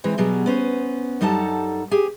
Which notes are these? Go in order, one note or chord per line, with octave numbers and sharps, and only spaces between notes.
E3 G#3 C4
B2 F#3 G3 G#4
B3 C#4 C5
F#2 G3 D#4 A4 F#5 A5
G4 G#4